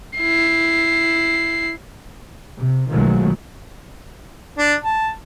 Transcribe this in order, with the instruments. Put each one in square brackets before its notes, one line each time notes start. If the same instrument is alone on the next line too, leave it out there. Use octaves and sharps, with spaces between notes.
[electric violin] E4 C7
[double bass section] C3
B1 D#3 F3 F#3 G#3 A3
[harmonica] D4
A5